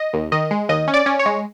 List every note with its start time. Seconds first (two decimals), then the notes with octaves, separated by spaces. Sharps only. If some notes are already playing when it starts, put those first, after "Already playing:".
Already playing: D#5
0.13 D#2
0.32 D#3 D#5
0.51 G#3
0.69 D#2 D#5
0.88 C#4
0.94 D5
1.06 C#4
1.19 C#5
1.26 G#3